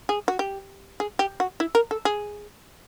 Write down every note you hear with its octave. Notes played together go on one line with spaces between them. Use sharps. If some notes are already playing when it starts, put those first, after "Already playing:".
G#4
F#4
G4
G#4
G4
F#4
E4
A#4
A4
G#4